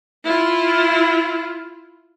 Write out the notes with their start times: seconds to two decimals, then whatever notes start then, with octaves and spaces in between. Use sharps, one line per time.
0.24 E4 F4